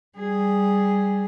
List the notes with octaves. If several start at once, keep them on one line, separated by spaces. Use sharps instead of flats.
G3 G#4